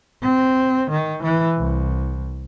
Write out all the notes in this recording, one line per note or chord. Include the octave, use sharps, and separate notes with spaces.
C4
D#3
E3
C2